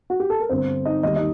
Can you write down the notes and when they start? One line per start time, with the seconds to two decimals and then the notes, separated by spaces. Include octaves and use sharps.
0.10 F#4
0.20 G4
0.30 A4
0.40 A#4
0.49 G1 G2 D3 C4 C5
0.85 D#4 D#5
1.03 D#2 D#3 G3 D#4 D#5
1.16 D#4 D#5